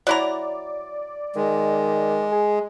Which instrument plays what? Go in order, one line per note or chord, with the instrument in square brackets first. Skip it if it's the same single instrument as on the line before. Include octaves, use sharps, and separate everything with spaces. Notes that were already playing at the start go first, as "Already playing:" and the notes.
[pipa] F#3 E4 A#5 [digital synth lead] D5
[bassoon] D#3 [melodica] G#3
[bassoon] G#4